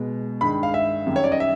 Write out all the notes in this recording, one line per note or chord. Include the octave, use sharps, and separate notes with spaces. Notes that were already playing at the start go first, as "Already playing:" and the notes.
Already playing: B2 G#3
G2 D#3 G#3 B5
F5
E5
F#2 D#3 G3
C#5
D5
D#5
E5